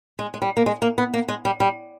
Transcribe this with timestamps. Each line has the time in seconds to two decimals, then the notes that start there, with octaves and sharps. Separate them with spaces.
0.19 G#3
0.34 G#3
0.42 G3
0.57 A#3
0.66 G#3
0.82 A#3
0.98 B3
1.14 A#3
1.28 G#3
1.45 G3
1.60 G3